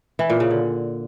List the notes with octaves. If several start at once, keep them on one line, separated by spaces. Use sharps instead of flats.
E3
A#2
C#3
D3